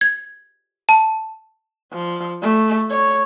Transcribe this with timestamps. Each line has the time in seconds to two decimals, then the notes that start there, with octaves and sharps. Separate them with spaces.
0.01 G#6
0.89 A5
1.93 F3
2.42 A3
2.91 C#5